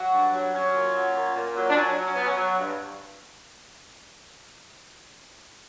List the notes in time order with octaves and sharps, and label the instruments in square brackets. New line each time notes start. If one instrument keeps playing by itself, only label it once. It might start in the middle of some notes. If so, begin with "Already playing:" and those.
Already playing: [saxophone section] F#3 F#4
G2
F#3
F#3 C#4
A#2
F#3
A#2
A#2
F#3
D4
F#3 C#4
F#3
C#4
F#3 B3
C#4
F#3
G2